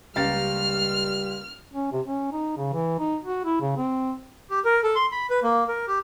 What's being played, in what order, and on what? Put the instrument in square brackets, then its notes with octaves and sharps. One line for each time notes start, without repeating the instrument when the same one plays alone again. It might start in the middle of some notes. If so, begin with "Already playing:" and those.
[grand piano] C#2 F5 A6 [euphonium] G3 [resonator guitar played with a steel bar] A#3 C#4 G4 [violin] F6
[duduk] C#4
C3
C#4
D#4
C#3
E3
D#4
F#4
E4
C#3
C4
[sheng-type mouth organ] G4
A#4
A4
C6
B5
B4
A#3
A#4
G4